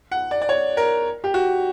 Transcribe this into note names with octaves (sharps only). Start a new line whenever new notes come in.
F#5
D5
D5
C#5
A#4
G4
F#4